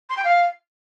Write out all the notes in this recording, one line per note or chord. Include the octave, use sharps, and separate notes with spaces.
C6
G5
F5